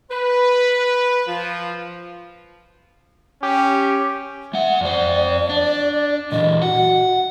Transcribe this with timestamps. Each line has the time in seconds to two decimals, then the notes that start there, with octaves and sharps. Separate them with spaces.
0.11 B4
1.27 F3
3.43 C#4 G4
4.53 G#3 E5 F#5
4.81 F2 C5 D5
5.49 D4
6.32 A#2 E3 D#5
6.62 F#4 F#5